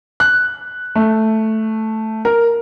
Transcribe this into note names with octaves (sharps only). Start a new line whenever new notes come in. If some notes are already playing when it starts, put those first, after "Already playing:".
F#6
A3
A#4